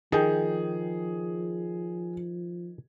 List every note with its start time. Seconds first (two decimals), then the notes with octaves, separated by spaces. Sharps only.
0.12 D#3 F3 G#4 G5